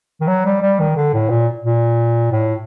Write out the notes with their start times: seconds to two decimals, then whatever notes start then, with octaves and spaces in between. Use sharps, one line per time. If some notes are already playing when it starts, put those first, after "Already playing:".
0.21 D#3
0.28 F#3
0.46 G3
0.62 G3
0.80 D#3
0.97 D3
1.14 A2
1.30 A#2
1.64 A#2
2.32 A2